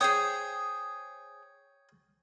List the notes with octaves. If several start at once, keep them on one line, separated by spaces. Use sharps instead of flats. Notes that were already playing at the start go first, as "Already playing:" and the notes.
G#4 C5 C#5 G5 D#6